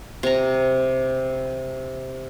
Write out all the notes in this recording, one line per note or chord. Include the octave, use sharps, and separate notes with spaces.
C3 A#5